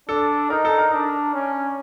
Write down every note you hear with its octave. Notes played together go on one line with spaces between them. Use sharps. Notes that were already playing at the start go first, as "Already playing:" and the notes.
D4 A4
D#4 A#4
A4
A#4
D4
C#4